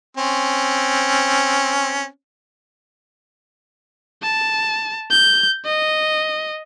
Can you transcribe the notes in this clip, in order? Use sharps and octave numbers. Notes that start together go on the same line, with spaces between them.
C4 C#4
A5
G6
D#5